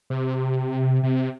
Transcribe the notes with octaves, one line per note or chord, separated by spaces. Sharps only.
C3
C3